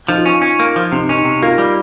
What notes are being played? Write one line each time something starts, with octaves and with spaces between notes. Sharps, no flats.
F3 D#4
F4
C#4
C#4
A#3
F3
C3 D#4
C#4 D#4
C3
A#3 F4
G3